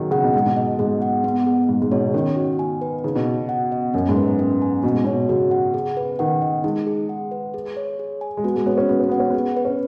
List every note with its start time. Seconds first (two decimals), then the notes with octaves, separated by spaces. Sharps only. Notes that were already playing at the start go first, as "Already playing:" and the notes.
Already playing: B2 D#3 F#3 G#4
0.11 C#3 F#5
0.24 B2
0.34 G#2 G#4
0.46 B2
0.57 D#5
0.79 G#2 G#4
1.02 F#5
1.24 B3
1.46 G#4
1.69 G#2 B3
1.82 G#2
1.91 B2 C#5
2.08 C#3
2.14 D#3 C#4
2.36 F#4
2.59 G#5
2.81 B4
3.04 C#3 D#4
3.16 B2
3.27 F#4
3.49 F#5
3.72 D#5
3.94 F#2 C#4
4.09 G#2
4.17 B4
4.24 F#2
4.39 C#4
4.62 G#5
4.84 B2 F#4
4.94 G#2
5.04 B2 C#5
5.29 C#3 F#4
5.51 F#5
5.74 G#4
5.97 B4
6.19 D#3 F#5
6.42 D#5
6.64 G#3 D#4
6.87 G#4
7.09 F#5
7.31 B4
7.54 G#4
7.77 C#5
7.99 G#4
8.21 G#5
8.37 G#3
8.44 B3 F#4
8.56 G#3
8.66 B3 C#5
8.78 C#4
8.89 B3 F#4
9.00 C#4
9.09 B3 F#5
9.20 C#4
9.30 B3 G#4
9.57 B4
9.65 C#4